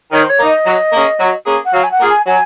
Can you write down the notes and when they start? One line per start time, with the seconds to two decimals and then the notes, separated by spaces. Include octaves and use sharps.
0.12 D#3 C#5
0.23 C5
0.29 C#5
0.39 A#3 D#4
0.48 D#5
0.66 F#3
0.92 A#3 C#4 G#4
1.20 F#3
1.46 A#3 C#4 G#4
1.65 F#5
1.73 F#3 F5
1.83 G#5
1.91 F#5
2.00 A#3 F4 G#4
2.09 G#5
2.27 F#3 G#5